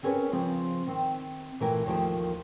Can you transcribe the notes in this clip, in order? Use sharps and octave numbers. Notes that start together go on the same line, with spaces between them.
C4 C#4 G#4 A#4 B4 C#5
C#3 F3 C4
D#3 C4
A#2 E3 A3 A#4 B4 G5
D#2 D#3 F3 A3 E4 G5